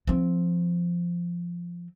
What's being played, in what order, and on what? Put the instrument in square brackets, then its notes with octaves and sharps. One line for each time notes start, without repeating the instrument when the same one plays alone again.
[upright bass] F3 C4